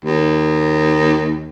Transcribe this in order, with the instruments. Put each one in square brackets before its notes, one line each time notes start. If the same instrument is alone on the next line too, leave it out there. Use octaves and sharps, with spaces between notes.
[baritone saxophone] D#2